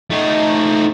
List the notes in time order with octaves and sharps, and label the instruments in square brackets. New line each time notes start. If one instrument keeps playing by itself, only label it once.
[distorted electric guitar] A3 D#4